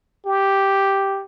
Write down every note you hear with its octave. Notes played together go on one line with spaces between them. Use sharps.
G4